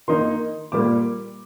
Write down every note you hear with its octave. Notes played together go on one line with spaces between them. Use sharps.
D#3 A#3 D#4 C6
A#2 G3 A#3 D6